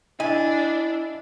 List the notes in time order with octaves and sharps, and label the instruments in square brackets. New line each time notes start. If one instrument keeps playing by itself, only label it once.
[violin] D4 [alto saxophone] E4 [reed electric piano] D#5 [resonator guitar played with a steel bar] G#5